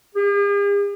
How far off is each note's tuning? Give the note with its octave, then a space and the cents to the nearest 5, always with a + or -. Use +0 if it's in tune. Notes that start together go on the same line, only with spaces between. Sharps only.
G#4 -45